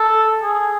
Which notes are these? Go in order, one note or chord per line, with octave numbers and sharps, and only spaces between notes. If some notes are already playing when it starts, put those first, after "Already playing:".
Already playing: A4
G#4